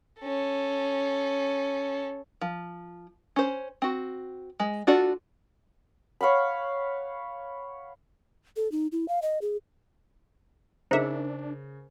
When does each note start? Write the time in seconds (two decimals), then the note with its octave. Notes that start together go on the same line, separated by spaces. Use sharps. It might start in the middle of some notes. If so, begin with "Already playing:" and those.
0.22 C#4 A4
2.41 F3
3.36 C#4 C5
3.82 C4 F#4
4.60 G#3
4.87 D4 F4 F#4 A4 D5
6.21 C#5 F5 F#5 B5
8.56 A4
8.72 D#4
8.92 E4
9.08 F5
9.22 D#5
9.42 G#4
10.91 C#3 D4 D#4 G#4 A#4 C5 E5